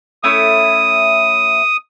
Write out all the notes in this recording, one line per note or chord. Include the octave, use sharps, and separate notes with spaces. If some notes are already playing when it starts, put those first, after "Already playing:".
A3 C#4 E4 D#6